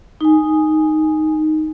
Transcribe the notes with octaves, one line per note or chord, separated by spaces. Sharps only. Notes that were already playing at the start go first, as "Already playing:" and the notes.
D#4 G#5